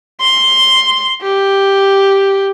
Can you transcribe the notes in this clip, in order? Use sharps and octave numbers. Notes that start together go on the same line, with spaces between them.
C6
G4